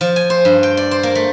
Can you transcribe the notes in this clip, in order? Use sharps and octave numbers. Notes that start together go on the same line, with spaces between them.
F3
G#5
C5
G2
G5
D5
C5
A#3
A3